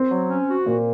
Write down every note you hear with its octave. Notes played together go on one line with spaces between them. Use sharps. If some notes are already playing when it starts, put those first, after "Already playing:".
Already playing: C4
F#3
C#4
F#4
A#2 A#3